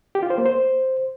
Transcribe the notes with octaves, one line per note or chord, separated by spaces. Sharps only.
G4
F4
C5
A#3
C5